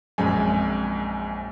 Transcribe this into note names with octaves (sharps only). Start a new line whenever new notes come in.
A#1 F#2 G#3 C4 G#5